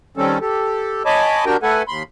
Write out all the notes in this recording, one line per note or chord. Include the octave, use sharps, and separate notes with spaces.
D#3 G3 C4 C#4 A4
G4 A4
C#5 D#5 G#5 A5 B5 D6
D4 F#4 G4 A#4 G5
A3 A4 B4 F#5 G#5
D#2 B5 C6